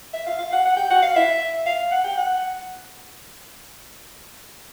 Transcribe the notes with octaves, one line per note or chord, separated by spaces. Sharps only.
E5
F5
F5
F#5
F#5
G5
F#5
F5
E5
F5
F#5
G5
F#5